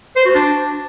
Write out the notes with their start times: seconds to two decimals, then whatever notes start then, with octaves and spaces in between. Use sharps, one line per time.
0.16 C5
0.25 F#4
0.35 D4